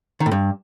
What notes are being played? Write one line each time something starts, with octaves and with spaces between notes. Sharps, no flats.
D#3
A2
G2